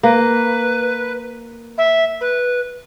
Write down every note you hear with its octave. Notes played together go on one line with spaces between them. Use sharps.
A#3 B4
E5
B4